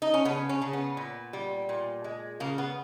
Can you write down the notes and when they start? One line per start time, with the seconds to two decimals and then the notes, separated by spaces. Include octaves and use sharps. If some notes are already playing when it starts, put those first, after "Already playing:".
0.02 D#4
0.14 C#4
0.25 C#3 B3
0.49 C#4
0.62 C#3
0.73 B3
0.97 A#2
1.33 G3
1.69 A#2
2.04 G#3
2.40 C#3 A#3
2.58 B3